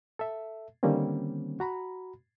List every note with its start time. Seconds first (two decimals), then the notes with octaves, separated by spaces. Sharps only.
0.19 A4 E5
0.83 D3 D#3 G3 A#3 C4 C#4
1.60 F#4 A#5 B5